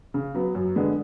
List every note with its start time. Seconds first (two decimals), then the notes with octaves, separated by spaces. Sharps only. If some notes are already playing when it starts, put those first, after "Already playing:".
0.14 C#3
0.35 F#3 B3
0.55 F#2
0.76 D3 G#3 B3